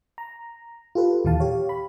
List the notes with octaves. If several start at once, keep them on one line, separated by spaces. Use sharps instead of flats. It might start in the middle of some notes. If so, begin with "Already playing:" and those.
A#5
F4 G4 A4 B4
D#2 A#2 E3 F5 A5
G4 C#5 F5
B5